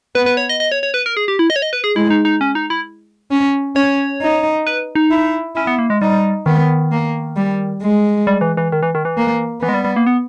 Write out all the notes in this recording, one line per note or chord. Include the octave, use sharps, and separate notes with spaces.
B3 B4
B4
C#5
D#5
D#5
C#5
C#5
B4
A#4
G#4
G4
E4
D#5
C#5
D#5
B4
G#4
G#3 E4
D#4
D#4
C#4
D#4
E4
C#4
C#4 C#5
D#4
B4
D#4
E4
C#4 E4
B3
A#3
G#3
G3 D#4
D#3 B3
A#3
G3
G#3
G3
E3
E3
D#3
E3
D#3
E3
A#3
E3 B3
G#3
G3
G3
A#3
B3